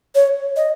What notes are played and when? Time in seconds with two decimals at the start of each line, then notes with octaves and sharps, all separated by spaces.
0.15 C#5
0.56 D#5